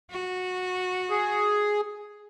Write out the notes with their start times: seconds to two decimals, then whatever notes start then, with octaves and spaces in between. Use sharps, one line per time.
0.11 F#4
1.10 G#4